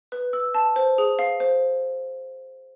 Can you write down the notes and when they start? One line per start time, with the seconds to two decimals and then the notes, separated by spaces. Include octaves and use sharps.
0.12 B4
0.33 E6
0.55 A5
0.76 C5
0.98 G#4
1.19 F5
1.40 C5